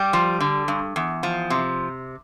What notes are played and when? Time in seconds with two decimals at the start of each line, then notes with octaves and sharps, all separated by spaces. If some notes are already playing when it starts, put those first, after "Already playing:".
Already playing: G3 G4
0.13 F3
0.40 D3
0.68 G2
0.96 E2
1.23 F3
1.50 C3